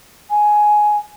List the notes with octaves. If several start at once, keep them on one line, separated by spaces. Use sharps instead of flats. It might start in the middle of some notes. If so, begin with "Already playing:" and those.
G#5